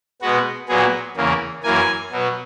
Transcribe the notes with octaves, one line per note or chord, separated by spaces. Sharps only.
B2 G#3 B3 F#4
A#2 F#3 B3 G#4
E2 C#3 E3 A#3
F#2 E3 A#3 G#5
B2 F#3 B3